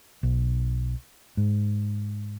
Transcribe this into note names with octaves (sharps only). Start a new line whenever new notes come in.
B1
G#2